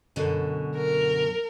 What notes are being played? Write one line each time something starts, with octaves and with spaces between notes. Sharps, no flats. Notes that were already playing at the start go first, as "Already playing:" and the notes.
F#2 B2 D3
A#4